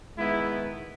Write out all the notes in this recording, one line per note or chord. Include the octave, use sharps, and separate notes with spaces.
D#3 G#3 B3 E4